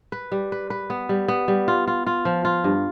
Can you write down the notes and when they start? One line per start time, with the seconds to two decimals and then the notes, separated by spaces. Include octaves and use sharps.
0.12 B4
0.32 G3
0.52 B4
0.70 B4
0.90 B3
1.09 G3
1.28 B3
1.48 G3
1.68 F4
1.87 F4
2.07 F4
2.25 F3
2.45 F4
2.64 G2